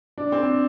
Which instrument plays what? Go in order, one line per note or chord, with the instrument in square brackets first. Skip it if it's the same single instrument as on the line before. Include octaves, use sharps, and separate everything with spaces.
[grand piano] D4
C4